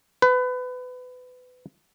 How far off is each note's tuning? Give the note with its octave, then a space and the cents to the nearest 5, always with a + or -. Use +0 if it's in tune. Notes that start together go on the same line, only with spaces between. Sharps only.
B4 +25